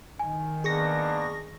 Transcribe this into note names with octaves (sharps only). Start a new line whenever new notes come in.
D#3 G#5
A#3 B3 D4 G#4 C#6 A#6